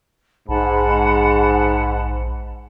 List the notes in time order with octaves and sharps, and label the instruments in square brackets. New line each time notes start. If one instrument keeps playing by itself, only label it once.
[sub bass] A#1 [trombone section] G#2 [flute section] F#5 A5 B5